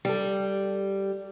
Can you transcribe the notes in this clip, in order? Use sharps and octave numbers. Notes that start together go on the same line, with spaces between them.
G3 G4 A4